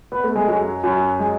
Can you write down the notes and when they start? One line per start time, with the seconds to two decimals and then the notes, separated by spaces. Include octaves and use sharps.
0.12 B3
0.24 A3
0.36 G#3
0.47 F#2 F#3
0.84 F#2 F#3
1.19 G#3